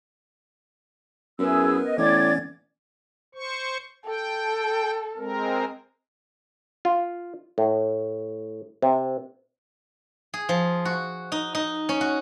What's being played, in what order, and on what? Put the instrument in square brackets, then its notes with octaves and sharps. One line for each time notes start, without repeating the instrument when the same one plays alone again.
[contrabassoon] F#2 [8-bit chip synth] B3 A#4 B4 [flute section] E4 G#4 E6
[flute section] D#5
[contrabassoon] A2 [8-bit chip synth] E3 B3 C#4 [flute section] D5 D6 G#6
[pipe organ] C5 C#6
[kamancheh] A4 [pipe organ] G5
[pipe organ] G#3 C4 A#4
[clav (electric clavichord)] F4
A2
C3
[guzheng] G#4
F3
F#4
D#4
D#4
C#4
F#4